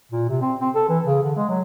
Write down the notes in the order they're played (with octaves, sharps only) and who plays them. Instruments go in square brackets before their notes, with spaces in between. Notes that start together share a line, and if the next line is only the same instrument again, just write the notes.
[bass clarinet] A#2
C3
C4
C4
A4
E3
C#3
D3
G#3
F#3